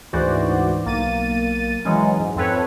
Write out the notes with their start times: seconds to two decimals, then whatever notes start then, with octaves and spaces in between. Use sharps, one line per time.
0.13 D2 G#2 E3 F#4 C5 D5
0.85 B1 A#3 A6 D#7
1.85 E3 F#3 G#3 C#4
2.20 G#2
2.36 F2 C4 A4 B4 C#5